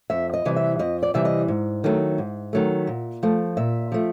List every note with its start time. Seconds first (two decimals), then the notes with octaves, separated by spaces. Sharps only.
0.10 F2 E5
0.34 D#5
0.45 C3 E3 G3
0.56 E5
0.79 F2 D#5
1.03 D5
1.14 C3 E3 G3 E5
1.25 D#5
1.48 G#2
1.84 D#3 F#3 A3
2.18 G#2
2.53 D#3 F#3 A3
2.87 A#2
3.23 F3 A3
3.57 A#2 E5
3.92 F3 A3